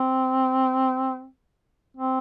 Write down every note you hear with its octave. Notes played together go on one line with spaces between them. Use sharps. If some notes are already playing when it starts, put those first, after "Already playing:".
Already playing: C4
C4